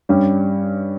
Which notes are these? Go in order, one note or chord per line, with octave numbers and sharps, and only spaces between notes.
G2 G3 C#4